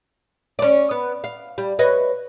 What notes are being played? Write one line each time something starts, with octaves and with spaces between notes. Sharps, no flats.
C#4 D5
B3
F5
G3
B4 C#5 D#5